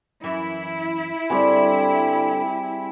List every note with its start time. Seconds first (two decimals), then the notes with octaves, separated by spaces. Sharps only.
0.24 F#2 E3 E4 E5
1.30 G2 D3 G3 C4 G#4